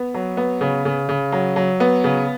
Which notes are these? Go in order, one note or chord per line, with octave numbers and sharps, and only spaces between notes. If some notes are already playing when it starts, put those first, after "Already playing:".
Already playing: B3
F#3
B3
C#3
C#3
C#3
F#3
F#3
B3
C#3